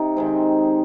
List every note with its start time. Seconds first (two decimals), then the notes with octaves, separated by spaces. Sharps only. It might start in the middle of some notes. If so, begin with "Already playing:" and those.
Already playing: C3 D#4
0.17 D#3 G#3 C4